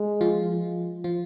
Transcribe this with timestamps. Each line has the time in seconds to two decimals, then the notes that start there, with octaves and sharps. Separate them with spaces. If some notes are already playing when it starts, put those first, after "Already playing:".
Already playing: G#3
0.21 F3 F4
1.04 F3 F4